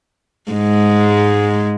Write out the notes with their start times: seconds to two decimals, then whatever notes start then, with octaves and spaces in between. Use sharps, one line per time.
0.51 G#2 G#3